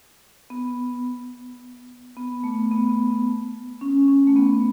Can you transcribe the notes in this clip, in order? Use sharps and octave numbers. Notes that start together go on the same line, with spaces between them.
B3
B3
A3
B3
C#4
C#4
A3
B3